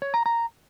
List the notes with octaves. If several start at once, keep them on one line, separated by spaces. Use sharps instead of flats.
C#5
A#5
A#5